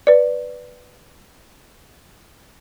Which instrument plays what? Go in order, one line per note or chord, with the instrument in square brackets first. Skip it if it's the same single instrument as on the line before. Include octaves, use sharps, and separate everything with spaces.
[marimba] B4 D5